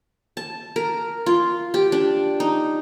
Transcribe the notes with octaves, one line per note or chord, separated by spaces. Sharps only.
A5
A#4
F4
G4
D4
D#4